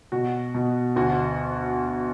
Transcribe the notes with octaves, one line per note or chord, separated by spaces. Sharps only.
B2 F#4
B2
D2 F#4